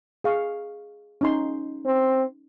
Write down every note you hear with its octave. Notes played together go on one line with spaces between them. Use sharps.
G#4 F5 C#6
C#4 D#4 C6
C4